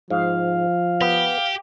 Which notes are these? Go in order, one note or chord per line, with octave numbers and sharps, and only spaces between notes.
G#2 F3 F5
B3 G4